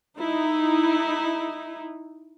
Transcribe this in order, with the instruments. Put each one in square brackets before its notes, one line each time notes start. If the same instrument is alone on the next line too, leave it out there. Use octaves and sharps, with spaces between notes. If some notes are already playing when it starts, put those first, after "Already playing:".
[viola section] D#4 E4